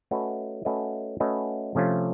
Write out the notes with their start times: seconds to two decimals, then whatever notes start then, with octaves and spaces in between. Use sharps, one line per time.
0.11 A3 C#4 F#4 B4 D#5
0.65 A3 C#4 F#4 B4 D#5
1.20 A3 C#4 F#4 B4 D#5
1.75 C3 F3 A3 C#4 F4